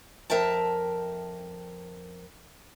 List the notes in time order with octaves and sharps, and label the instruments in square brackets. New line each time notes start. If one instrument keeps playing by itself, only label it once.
[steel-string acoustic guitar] F2 A#4 E5 G5 A5